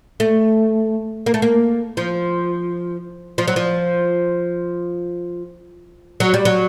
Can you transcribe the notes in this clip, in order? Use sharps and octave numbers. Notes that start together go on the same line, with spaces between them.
A3
A#3
A3
A#3
F3
F3
F#3
F3
F#3
G3
F#3